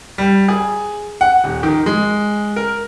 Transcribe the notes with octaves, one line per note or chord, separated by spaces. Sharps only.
G3
G#4
F#5
D#1
D#3
G#3
A#4